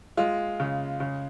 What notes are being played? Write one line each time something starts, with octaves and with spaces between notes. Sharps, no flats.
G#3 F4
C#3
C#3